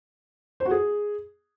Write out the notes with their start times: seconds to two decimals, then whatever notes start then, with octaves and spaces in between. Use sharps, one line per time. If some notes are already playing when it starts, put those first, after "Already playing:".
0.60 C5
0.65 F#4
0.71 G#4